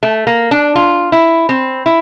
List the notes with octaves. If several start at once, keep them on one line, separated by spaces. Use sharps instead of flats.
A3
A#3
D4
F4
E4
C4
E4